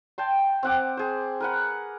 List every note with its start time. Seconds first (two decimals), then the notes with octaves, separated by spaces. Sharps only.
0.18 G5 A5 C6
0.63 C4 F#5 D6
0.97 G#4 C5
1.40 A#4 B4 F#5